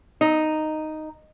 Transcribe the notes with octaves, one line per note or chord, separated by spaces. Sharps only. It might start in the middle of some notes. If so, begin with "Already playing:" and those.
D#4